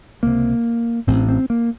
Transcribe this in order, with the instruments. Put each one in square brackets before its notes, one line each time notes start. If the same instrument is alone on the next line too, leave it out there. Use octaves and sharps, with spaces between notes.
[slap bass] C#2 C3 A#3
A1 A2 C4
C4
A#3